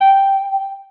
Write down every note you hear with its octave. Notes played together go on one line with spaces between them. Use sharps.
G5